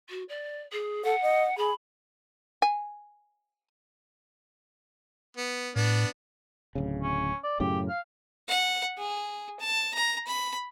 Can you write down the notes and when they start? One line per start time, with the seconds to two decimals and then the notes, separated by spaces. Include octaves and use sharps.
0.09 F#4
0.28 D5
0.72 G#4
1.04 A4 F#5
1.22 D#5
1.57 G#4 B5
2.62 G#5
5.37 B3
5.76 A2 B3 D4
6.75 D1 C#3
7.03 C#4
7.43 D5
7.60 F#2 A2 C#3 G4
7.89 F5
8.48 F#5
8.98 G#4
9.60 A5
9.94 A#5
10.27 B5